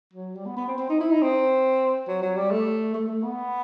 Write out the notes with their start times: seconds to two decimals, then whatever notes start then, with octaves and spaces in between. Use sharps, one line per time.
0.14 F#3
0.35 G3
0.46 B3
0.57 B3
0.68 C4
0.78 C4
0.89 D#4
1.00 E4
1.11 D#4
1.22 C4
2.08 F#3
2.22 F#3
2.37 G3
2.51 A3
2.94 A3
3.09 A3
3.23 B3